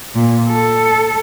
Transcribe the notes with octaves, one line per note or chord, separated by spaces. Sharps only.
A#2
A4